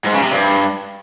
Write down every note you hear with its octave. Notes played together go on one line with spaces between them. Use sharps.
G#2
C#3
C3
G2